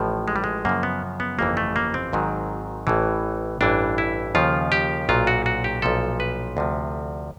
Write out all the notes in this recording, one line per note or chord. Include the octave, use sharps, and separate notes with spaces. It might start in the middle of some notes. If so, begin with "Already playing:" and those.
Already playing: A1 A2 F3
G#3
G3
G#3
F#2 C#3 F3 A#3
B3
B3
G1 F2 C#3 E3 A#3
A3
A#3
C4
G#1 G#2 D#3 F#3
A1 A2 E3
A1 G2 E3 D4
E4
D#2 C#3 F3 F4
G4
B1 A#2 F#3 F4
F#4
F#4
G4
B1 A#2 F3 A4
B4
D2 C3 F3